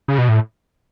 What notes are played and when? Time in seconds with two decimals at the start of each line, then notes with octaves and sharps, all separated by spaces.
0.08 C#3
0.18 B2
0.29 A2